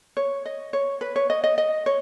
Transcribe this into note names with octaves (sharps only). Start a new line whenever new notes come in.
C#5
D#5
C#5
B4
C#5
D#5
D#5
D#5
C#5